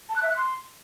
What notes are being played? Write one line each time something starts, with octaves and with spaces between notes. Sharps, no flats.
A5
F#6
E5
F#6
C6